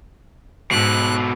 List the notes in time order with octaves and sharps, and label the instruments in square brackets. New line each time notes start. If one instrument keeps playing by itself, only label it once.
[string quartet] G#2 F#6 [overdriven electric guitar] B2 A4